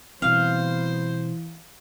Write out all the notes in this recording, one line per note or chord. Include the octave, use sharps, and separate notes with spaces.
B2 E3 G3 B3 C4 C5 F5